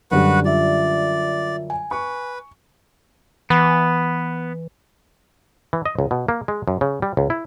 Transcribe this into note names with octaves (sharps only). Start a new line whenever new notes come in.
F#2 D3 G3 F#4 B4 F#5
F4 D5 E5
G#5
B4 C#6
E3 B3
E3
D#5
C#2
B2
A#3
G#3
F#2
C#3
G3
C#2
E4